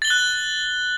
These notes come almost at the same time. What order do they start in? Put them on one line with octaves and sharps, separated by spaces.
A6 G7 F#7 F#6